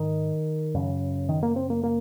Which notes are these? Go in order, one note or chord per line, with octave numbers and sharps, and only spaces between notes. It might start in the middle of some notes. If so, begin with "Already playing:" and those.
Already playing: G#2 D#3
F#2 C#3
D#3
A#3
C4
A#3
A#3